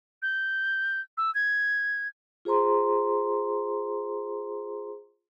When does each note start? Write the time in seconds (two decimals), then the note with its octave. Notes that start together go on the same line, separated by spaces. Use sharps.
0.22 G6
1.18 E6
1.35 G#6
2.45 F4 G#4 C5 A#5 C6